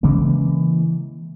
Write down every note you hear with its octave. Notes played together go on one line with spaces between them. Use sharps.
C#3 E3 G#3 A#3